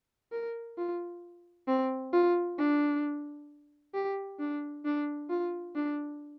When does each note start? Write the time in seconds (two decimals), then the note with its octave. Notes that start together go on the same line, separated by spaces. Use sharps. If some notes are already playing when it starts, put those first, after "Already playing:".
0.32 A#4
0.78 F4
1.68 C4
2.13 F4
2.59 D4
3.95 G4
4.40 D4
4.85 D4
5.30 F4
5.76 D4